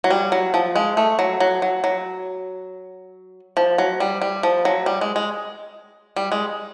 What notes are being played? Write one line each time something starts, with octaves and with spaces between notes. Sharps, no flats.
F#3
G3
F#3
F3
G#3
A3
F#3
F#3
F#3
F#3
F3
F#3
G3
G3
F3
F#3
G3
G#3
G#3
G3
G#3